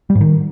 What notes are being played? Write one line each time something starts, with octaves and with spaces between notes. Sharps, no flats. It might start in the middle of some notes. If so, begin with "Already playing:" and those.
G3
G#2
D#3